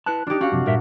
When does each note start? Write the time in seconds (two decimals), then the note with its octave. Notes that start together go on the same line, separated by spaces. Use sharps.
0.06 E4 B4 A5 F#6
0.27 D4 D#4 F4 G4
0.41 C#4 F#4 F5 F#5
0.52 F#2 C3 F3
0.66 G2 A#2 A#4 E5